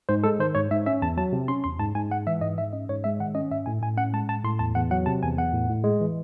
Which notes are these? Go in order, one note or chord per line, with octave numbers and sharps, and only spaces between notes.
G#2 C5
G#3 A4
D#3 C5
G#2 C#5
G#2 E5
C#4 E5
E2 A5
F#3 A5
C3
C#4 C6
E2 C6
G#2 A5
G#2 G#5
G#3 F#5
E3 E5
G#2 D#5
G#2 E5
C#4 D#5
G#2 C#5
G#3 E5
D#3 F#5
C#4 D#5
G#2 E5
A2 G#5
A2 G#5
C#4 F#5
G#3 A5
A2 A5
A2 C6
E2 A5
E2 F#5
F#3 F#5
C3 A5
E2 G#5
E2 F#5
A2
A2
G#3
E3